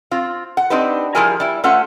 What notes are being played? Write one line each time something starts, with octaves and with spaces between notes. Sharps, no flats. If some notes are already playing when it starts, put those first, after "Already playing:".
C4 F4
F#5
C4 D4 D#4 G4 B4
F3 G3 E4 G#4 A#4 G#5
G3 E4
A3 C#4 F4 A4 B4 F#5